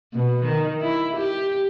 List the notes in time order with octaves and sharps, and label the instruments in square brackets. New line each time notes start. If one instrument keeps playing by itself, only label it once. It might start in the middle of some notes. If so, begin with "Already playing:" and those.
[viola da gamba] B2
D#3
E4
G4